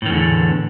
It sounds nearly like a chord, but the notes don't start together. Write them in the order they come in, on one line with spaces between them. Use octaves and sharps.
A2 D#3 E2 D3